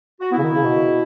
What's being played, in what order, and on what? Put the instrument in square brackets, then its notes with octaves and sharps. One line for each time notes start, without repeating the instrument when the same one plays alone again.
[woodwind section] F#4
[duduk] B3 [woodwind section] E4
[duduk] C#3
D#3
C#3
B2